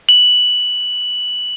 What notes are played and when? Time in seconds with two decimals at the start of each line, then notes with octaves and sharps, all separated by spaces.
0.09 F#7